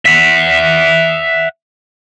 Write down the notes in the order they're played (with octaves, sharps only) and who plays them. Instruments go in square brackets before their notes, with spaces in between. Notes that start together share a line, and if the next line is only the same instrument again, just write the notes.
[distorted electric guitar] E5 F#5